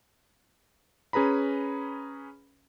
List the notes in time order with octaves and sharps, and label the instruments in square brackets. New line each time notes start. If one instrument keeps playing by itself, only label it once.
[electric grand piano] C#4 G#4 B4 A#5 B5